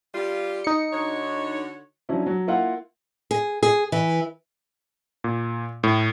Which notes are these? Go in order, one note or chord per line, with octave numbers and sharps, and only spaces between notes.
G3 F4
D#4 C#7
D3 F#4 C#5
F3 F#3 C#4 D4 E4
F#3
A#3 E4 F4 F#5
G#4
G#4
E3
A#2
A2